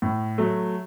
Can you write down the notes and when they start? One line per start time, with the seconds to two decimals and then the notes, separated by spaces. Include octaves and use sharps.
0.02 A2
0.38 F#3 A3